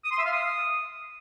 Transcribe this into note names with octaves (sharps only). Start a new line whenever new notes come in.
D#6
C6
E5
F5
D#6